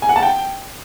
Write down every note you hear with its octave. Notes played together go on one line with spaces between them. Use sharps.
G#5
F#5
A5
G5